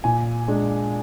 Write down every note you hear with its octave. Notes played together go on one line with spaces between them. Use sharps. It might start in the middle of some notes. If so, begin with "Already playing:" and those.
A#2 G#5
G#3 D4